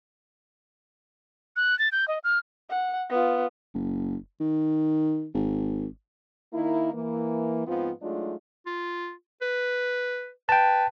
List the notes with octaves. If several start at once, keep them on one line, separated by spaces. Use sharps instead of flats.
F#6
A6
G6
D#5
F6
F#5
B3 F4
F#1
D#3
G#1
D#3 A#3 D#4 E4
E3 A#3
G#2 F3 B3 C4 F4
F#3 G#3 A3 D4 D#4 F4
F4
B4
B4 G5 A5